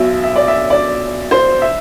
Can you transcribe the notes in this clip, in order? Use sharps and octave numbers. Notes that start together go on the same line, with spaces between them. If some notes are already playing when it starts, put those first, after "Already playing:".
Already playing: B1 B2 E5
E5
D5
E5
D5
C5
E5